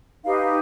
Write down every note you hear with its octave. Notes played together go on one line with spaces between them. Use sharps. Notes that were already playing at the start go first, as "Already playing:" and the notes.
D#4 G4 B4 F5